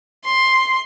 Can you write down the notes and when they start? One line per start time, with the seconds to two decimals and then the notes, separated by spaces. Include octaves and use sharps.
0.25 C6